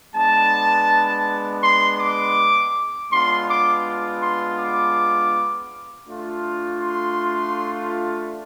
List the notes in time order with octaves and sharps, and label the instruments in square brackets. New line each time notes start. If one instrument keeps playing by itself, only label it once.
[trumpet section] G#3 B3 D4 A5
C6
D6
G#3 B3 D4 F4 C6
D6
C6
D6
A3 D4 F4
C6